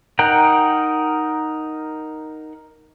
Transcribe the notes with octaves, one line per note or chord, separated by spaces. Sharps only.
D#4 A#4 F#5 G5